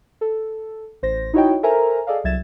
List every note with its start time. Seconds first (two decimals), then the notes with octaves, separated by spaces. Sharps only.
0.21 A4
1.02 A1 C5 A#6
1.33 D#4 E4 F#4 C#5 D#5 G5
1.63 A4 A#4 C5 E5 G#5 A#5
2.07 G#4 A4 D5 D#5 F5
2.24 C2 F#3 E5 G#6 A6 E7